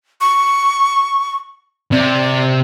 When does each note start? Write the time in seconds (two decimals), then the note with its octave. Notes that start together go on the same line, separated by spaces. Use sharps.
0.21 C#6
1.92 C3 D5